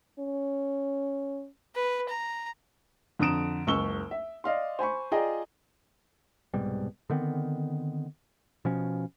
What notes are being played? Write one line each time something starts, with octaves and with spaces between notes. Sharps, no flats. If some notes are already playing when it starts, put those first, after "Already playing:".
C#4
B4
A#5
F2 D3 A#5 D#6 D7 E7
F#1 C#2 C#6 E6 G7
E5
D5 D#5 F5 C6
C5 G#5 B5 C#6
F4 G#4 D5 D#5 G5 A#5
C2 G#2 B2 G3
D3 D#3 B3 C4
B2 F3 C#4